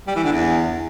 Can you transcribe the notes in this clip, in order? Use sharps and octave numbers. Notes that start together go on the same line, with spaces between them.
G3
E3
D3
E2